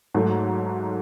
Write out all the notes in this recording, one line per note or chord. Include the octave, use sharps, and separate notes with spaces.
G#2 F#3 A3